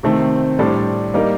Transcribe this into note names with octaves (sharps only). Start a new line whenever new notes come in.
C3 D#3 A3 C4
A2 G3 D4 A4 C5
G3 A#3 D#4 A#4